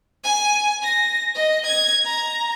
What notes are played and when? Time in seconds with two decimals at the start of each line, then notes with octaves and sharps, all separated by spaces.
0.24 G#5
0.83 A#6
1.35 D#5
1.66 G#6
2.05 A#5